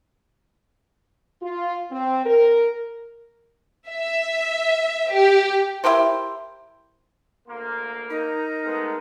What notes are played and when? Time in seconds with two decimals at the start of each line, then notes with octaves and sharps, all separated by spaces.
1.42 F4
1.92 C4
2.26 A#4
3.89 E5
5.12 G4
5.84 E4 G4 A#4 C5
7.47 D2 A#3 C6
8.10 D#4 A#4 A#5
8.64 G#3 A3 B3